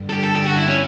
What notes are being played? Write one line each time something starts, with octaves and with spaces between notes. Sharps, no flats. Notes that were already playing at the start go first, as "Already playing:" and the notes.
Already playing: G2 D3 G3
A4
G4
A4
G4
F#4
E4 B4
C#4